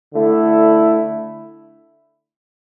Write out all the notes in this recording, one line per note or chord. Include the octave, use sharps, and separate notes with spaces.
D3 A3 E4